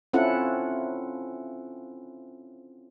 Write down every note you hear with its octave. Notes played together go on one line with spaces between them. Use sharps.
C4 C#4 E4 F4 A4 F#5